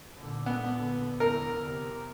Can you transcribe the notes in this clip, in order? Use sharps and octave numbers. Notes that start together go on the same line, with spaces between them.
A#2 D3
B3
E2 D3 A#4
C3